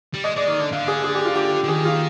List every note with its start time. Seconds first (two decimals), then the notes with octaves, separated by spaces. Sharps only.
0.14 G3
0.24 G#3 D#5
0.36 G#3 D5
0.48 D#3 D5
0.60 D3
0.72 D3 F5
0.88 G#4
1.04 G#4
1.15 G4
1.25 F4
1.35 G4
1.64 D3
1.68 D#3 G#4
1.85 F4